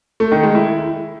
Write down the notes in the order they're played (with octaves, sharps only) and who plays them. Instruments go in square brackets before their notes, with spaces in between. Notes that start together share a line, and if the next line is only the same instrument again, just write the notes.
[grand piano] A3
D#3
G#3
E4